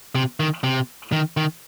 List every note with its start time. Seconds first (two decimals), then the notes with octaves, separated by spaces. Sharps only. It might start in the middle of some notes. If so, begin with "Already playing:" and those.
0.15 C3
0.40 D#3
0.64 C3
1.12 D#3
1.37 D#3